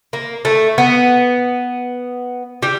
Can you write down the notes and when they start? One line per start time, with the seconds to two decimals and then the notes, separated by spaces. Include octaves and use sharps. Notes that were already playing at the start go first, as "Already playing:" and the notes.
0.13 A#3
0.45 A3
0.78 B3
2.63 G3